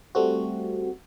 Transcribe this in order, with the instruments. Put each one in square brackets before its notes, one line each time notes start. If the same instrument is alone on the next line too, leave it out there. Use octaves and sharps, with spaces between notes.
[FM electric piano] G3 A3 C4 F#4